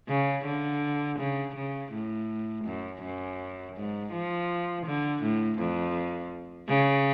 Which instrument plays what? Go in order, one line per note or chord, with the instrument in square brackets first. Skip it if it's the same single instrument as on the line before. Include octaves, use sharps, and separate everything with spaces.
[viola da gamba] C#3
D3
C#3
C#3
A2
F#2
F#2
G#2
F3
D3
A2
F2
C#3